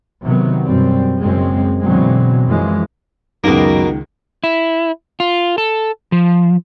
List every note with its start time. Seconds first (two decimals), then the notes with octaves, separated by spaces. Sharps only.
0.24 C3 D#3 F#3 B3
0.65 F#2 B2 G3 C4
1.20 F#1 F#2 G#3 C4
1.82 B2 D3 E3 F#3 G#3 C4
2.47 F#2 E3 F3 G#3
3.44 C#2 F#2 B2 D#3 A#3
4.44 E4
5.20 F4
5.58 A4
6.12 F3